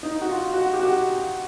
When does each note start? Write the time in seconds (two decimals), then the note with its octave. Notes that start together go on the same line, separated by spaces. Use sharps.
0.03 D#4
0.22 F#4
0.29 F4
0.54 F#4
0.74 G4
0.79 F#4